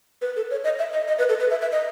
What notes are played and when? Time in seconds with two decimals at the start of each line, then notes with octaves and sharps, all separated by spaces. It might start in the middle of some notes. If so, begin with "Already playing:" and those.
0.21 B4
0.36 A4
0.51 C#5
0.64 D#5
0.79 E5
0.92 D#5
1.08 D#5
1.18 B4
1.29 A4
1.39 B4
1.50 E5
1.61 E5
1.72 D#5